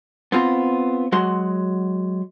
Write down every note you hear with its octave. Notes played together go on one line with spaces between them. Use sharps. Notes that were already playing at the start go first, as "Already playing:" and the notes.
B3 C4 F4
F#3 G#3 F#4 C6